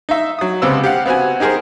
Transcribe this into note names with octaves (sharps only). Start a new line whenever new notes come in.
D#4 E5
F#3 D#6
C#2 C3 B3 C5 E6
G4 F5 F#5
B3 C4 F#4 G#5
D#4 G4 G#4 A#4 C5